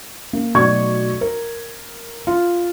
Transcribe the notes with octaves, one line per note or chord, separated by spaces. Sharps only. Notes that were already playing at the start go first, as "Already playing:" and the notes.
A#3
B1 F#3 A3 D5 C#6 G#6
A#4
F4